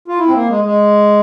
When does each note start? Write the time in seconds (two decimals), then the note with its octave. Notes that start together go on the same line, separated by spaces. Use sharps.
0.08 F4
0.19 E4
0.28 C4
0.34 A#3
0.49 G#3
0.64 G#3